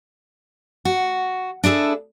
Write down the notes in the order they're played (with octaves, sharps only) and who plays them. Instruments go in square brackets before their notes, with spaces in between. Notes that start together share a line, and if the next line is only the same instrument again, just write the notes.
[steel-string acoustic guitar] F#4
D4 E4 G#4 A4